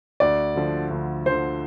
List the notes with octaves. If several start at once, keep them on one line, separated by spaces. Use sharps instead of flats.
D2 D5
D3 F3
D2
D3 F3 C5